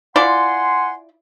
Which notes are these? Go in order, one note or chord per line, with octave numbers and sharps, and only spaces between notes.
E4 F4 D5 F#5 G#5 C6